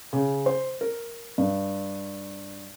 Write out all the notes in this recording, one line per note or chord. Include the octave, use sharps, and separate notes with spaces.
C#3
C5
A#4
G2